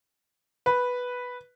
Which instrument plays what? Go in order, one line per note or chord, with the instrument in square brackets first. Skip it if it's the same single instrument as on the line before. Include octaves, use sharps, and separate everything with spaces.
[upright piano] B4